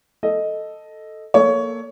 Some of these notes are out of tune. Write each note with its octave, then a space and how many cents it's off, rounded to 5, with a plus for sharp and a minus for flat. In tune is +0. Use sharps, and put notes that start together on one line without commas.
A4 +0 D#5 +0
A#3 +0 A4 +0 C#5 +15